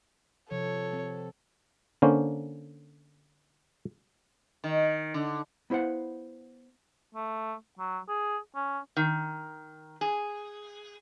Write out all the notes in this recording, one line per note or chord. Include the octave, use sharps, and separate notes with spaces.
C3 F3 A4 C#5
C4
D3 A#3 C#4 C5
D#3
D3
B3 E4 C5 F5 F#5
A3
F#3
G#4
C#4
D#3
G#4